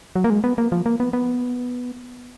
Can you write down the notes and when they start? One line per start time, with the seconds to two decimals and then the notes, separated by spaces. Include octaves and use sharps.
0.16 F#3
0.24 A#3
0.30 G#3
0.44 B3
0.58 A#3
0.72 F3
0.86 A#3
1.00 B3
1.13 B3